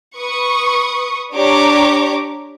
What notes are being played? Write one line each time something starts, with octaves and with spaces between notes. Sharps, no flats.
B4 C#6 D#6
D4 G4 C#5 A#5 D6